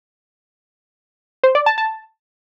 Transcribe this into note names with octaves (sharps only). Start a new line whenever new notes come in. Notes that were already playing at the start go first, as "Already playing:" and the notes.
C5
D5
A5
A5